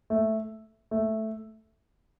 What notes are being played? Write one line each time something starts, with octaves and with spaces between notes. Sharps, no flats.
A3
A3